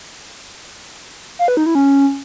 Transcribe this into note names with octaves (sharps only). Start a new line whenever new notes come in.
F5
B4
D#4
E4
C#4